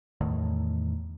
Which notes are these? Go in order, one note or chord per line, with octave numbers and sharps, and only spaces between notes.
E2 A2 D#3